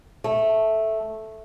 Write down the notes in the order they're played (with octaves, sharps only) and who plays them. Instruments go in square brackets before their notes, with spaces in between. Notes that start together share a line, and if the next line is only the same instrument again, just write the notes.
[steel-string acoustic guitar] A3